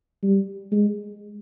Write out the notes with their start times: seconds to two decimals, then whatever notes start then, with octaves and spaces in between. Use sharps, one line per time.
0.23 G3
0.72 G#3